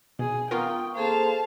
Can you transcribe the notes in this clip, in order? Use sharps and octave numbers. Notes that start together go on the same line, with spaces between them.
B2 G#4
B3 F4 A#4 G5 C#6 D#6
A#3 G#4 A4 C5 F5 A5